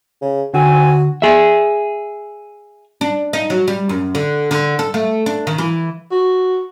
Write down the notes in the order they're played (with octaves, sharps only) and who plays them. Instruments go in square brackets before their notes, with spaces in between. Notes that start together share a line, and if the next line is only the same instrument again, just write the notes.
[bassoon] C#3
[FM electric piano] D3 [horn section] C4 G#5 [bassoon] F#4
[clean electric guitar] G#4 E5
[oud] D4
D#4
F#3
G3
F#2
D3
D3
A4
A3
D4
D#3
E3
[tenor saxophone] F#4